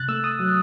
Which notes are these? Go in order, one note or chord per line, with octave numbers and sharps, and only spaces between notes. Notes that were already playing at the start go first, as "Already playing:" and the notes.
Already playing: C3 F#6 A6
A3 E6
D#6
F#3